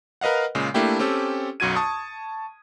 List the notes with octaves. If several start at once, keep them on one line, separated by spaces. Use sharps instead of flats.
A#4 B4 D#5 F5 F#5
A#2 C#3 G#3
A3 A#3 D4 E4 G4 G5
C4 C#4 G4 A4
B1 F#2 F#4 G#6 D#7
A5 C#6 D#6